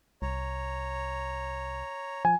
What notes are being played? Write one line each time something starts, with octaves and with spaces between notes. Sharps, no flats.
C2 C#5 A#5
F3 G#5